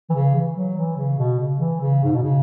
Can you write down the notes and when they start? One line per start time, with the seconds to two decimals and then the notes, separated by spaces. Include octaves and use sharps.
0.10 E3
0.14 C#3
0.35 E3
0.56 F#3
0.76 E3
0.97 C#3
1.18 B2
1.39 C#3
1.60 E3
1.80 C#3
2.04 G#2
2.12 B2
2.22 C#3